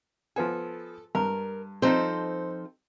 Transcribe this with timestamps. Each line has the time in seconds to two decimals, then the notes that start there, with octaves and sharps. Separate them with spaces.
0.36 F3 B3 A4 G#5
1.15 G2 A#4
1.82 F3 C4 D#4 A4 C5